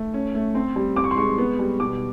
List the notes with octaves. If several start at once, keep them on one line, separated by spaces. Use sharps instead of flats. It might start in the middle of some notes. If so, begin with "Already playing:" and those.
Already playing: A3
C#4
A3
C4
G3
C4 D6
C#6
C6
G#3 C#6
B3
G3
B2 D6